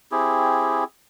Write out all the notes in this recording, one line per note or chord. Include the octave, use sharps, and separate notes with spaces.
C4 E4 G4 G#4